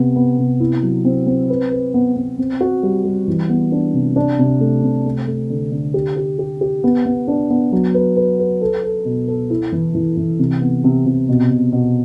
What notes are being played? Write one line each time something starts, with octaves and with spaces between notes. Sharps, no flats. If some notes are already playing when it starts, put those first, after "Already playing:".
Already playing: C3 B3
B3
C3
E4
F#3
C4
C4
B4
B4
B3
B3
C4
F#4
G3
G3
E3
B3
D4
C3
D4
C3
A3
C3
A3
A3
D3
D3
G4
G4
G4
G4
B3
B3
D4
B3
F#3
B4
B4
B4
A4
A4
B2
A4
E4
E3
E3
E3
C3
B3
C3
C3
B2
B2
B2